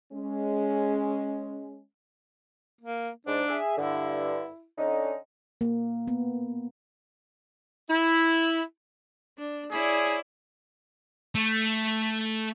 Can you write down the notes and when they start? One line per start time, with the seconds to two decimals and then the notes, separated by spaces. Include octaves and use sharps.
0.13 G#3 C#4
2.81 A#3
3.27 G#2 D4
3.49 G#4 E5
3.78 G2 D3 E4
4.78 D3 C#4 D#4
5.61 A#3
6.08 B3
7.90 E4
9.38 D4
9.72 E4 G#4 C#5 D5
11.35 A3